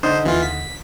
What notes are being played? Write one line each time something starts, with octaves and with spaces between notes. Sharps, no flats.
D3 D4 D#4 C5 D#6
D#2 E3 F4
B6